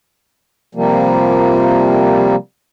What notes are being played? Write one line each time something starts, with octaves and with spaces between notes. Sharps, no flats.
C3 F3 G3 A#3